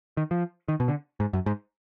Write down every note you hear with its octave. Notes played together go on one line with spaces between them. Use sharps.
D#3
F3
D#3
B2
D3
G#2
F#2
G#2